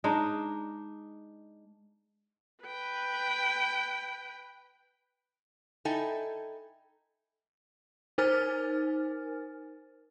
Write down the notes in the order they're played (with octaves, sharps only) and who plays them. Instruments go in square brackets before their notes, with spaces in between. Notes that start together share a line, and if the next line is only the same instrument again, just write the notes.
[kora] G#3 D4 D#4
[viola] B4 G5
[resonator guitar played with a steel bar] D#4 E4 A4 G5 G#5
[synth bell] D#4 A#4 C5 G#5 F6 A6